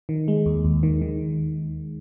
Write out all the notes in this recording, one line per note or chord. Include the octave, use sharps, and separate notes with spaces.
D#3
G#3
D#2
D#2
D#3
D#3